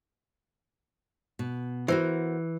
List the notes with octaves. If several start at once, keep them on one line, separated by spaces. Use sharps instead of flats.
B2
E3 F#4 A#4 C5